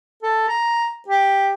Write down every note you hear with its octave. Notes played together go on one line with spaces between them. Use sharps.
A4
A#5
G4